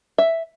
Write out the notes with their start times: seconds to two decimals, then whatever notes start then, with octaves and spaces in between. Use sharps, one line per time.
0.18 E5